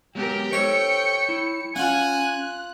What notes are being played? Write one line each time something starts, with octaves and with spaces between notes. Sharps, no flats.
F#3 G#3 B3 G4 A#4 G5
G4 A4 C5 C#5 C#7
E4
C#4 F4 F#5 G#5 F#6